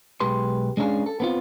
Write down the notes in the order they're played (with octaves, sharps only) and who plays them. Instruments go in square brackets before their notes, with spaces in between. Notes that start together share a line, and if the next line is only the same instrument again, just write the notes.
[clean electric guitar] B1 G#3 G4 B4 C6
G#3 C#4 D4 E4 G#4 F5
A4
B3 C4 F4